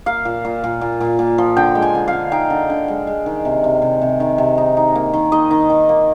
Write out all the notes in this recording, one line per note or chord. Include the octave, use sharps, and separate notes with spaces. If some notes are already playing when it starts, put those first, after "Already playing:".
A#3 F5
A#2
A#2
A#2
A#2
A#2
A#2
F3
D3 G5
G#3
G#5
D3
F5
D3
D#4 G5
D3
D3
G#3
G#3
D#3
C3
C3
C3
C3
D#3
C3
D#4
D#4
A#3
D#3
D#4 D#5
D#3
D#3
A#3